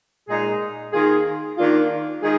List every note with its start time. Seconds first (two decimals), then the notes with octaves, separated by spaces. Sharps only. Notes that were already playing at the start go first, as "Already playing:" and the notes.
0.28 A#2 G#3 D#4 G#4
0.92 D#3 A#3 F4 G#4
1.57 D#3 A#3 D4 F4
2.21 D#3 G#3 D#4 G#4